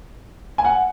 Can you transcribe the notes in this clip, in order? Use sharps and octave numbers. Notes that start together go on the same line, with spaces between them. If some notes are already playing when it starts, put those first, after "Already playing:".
G#5
F#5